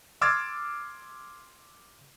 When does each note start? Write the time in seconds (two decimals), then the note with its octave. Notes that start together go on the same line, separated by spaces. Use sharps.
0.21 C6 D6 E6 F6 G#6 A6